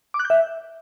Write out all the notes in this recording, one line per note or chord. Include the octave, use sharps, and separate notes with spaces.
D6
F#6
G6
E5